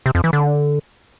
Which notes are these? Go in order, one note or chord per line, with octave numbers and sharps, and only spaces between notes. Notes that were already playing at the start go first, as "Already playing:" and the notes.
C3
F2
E3
D3